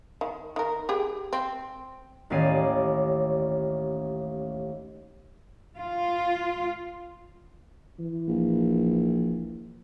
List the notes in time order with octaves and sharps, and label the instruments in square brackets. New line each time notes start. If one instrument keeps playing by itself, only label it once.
[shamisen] D#3
D#3 A#4
G4 G#4 G5
C4
[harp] A1 D#2 C#4 D5 C7 D#7
[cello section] F4
[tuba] E3
[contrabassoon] A#1